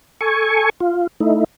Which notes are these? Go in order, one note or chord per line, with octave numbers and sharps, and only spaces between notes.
A4 G#5 C#6
F4
A3 D#4 E4